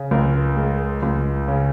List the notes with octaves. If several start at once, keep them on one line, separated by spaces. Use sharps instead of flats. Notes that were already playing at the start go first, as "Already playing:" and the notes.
Already playing: C#3
C#2 A#4
G#3
C#2
C#3